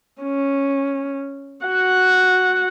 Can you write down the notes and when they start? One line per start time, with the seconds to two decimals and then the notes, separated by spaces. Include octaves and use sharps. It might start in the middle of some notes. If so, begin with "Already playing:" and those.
0.22 C#4
1.66 F#4 F#5